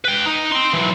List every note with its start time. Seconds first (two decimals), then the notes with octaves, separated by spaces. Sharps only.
0.05 B4 G5
0.25 D#4
0.52 G5 C6
0.74 E3 F#3